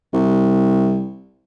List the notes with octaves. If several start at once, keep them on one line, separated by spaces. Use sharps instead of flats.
C2